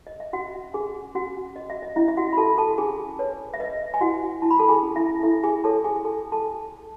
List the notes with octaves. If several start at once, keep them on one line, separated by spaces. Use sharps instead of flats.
D#5
E5
C#4 F#4 F#5
C#4 G#4 G#5
C#4 F#4 F#5
C#4 D#5
E5
D#5
C#4 E4 E5
E5
F#4 F#5
B5
F#4 A4 A5
A4 A5
C#4 G#4 G#5
B4 C#5
E5
B4 D#5
G#5
E4 F#4 F#5
E4 A5
B5
A4 A5
G#4 G#5
C#4
E4 E5
E4 A4 E5
G#4 G#5
A4 C#5 A5
G#4 G#5
G#5
A4 A5
A4 A5
A4